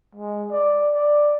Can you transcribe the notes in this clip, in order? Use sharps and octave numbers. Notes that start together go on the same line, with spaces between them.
G#3
D5
D5